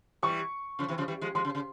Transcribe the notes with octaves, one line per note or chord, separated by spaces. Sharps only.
E3 G3 C#6
C#3 F3
C3 E3
C#3 F3
E3 G3
F3 G#3
F3 G#3 C6
C#3
C#3